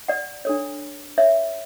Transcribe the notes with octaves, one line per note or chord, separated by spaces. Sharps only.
D5 F#5
D4 A4 C#5
C#5 E5